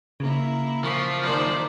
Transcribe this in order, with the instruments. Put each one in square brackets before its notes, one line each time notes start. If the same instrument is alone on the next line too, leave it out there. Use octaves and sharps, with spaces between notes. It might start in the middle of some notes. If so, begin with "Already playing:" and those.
[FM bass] C#3 [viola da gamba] A#3 E4
[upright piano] A#2 C#6 B6 [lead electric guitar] F3
[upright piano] F#1 A#3 [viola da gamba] D#3 C5 D5